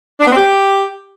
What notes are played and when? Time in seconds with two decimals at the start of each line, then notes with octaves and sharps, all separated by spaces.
0.20 D4
0.25 B3
0.31 C4
0.36 G4